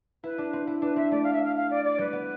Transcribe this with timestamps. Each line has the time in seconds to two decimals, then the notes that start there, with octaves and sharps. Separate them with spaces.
0.24 E4 B4
0.38 D4
0.53 C4
0.67 E4
0.82 D4 B4
0.96 C4 E5
1.11 A3 D5
1.23 F5
1.33 E5
1.44 F5
1.55 F5
1.70 D5
1.84 D5
1.99 G3 B4
2.13 B3